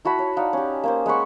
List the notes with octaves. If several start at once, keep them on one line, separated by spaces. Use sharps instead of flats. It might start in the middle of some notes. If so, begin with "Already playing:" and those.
E4 F#4 A5 B5
C#5
D#4 D5 F5 F#5
C#4 G4
A#3 C#4 C5
G#3 F#5 B5 C#6